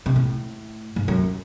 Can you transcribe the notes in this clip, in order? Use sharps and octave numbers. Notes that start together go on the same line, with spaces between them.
C3
A2
G#2
F#2